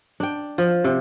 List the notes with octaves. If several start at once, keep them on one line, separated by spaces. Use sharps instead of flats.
D4 G5
F3
C3